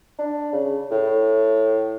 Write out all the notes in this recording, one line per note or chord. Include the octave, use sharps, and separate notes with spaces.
D4
C#3
A2